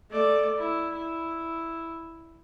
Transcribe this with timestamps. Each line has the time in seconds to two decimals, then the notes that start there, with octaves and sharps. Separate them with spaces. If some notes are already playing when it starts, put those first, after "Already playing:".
0.10 A3 D5
0.58 E4
0.94 E4